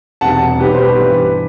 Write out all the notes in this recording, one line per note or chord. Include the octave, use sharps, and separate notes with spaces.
E1 E2 C3 G3 F#5 A5
B1 B2 G3 B3 G4 B4
C5
G4 B4
G2 E3 G3 G4 B4